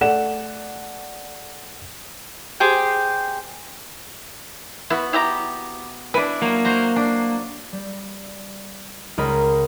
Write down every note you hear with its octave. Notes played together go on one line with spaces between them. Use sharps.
A3 D5 F#5 E7
G4 G#4 C5 G5
B3 E4 F#4
E4 G4 A#5
D4 E4 B4
F#3 A#3
F#4 C5 A#5
D4
G3
C#2 A#4 D#5 B5